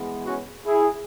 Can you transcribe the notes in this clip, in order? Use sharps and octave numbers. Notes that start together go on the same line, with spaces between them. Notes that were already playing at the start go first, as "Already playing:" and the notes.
Already playing: E3 G#3 B3
C#4 F#4
E4 G#4